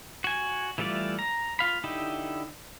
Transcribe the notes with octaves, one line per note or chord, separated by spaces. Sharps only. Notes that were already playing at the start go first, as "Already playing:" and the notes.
F#4 G#5
E3 G3 A3 F4 D5
A#5
F4 F5 B5
D3 D#4 E4 G4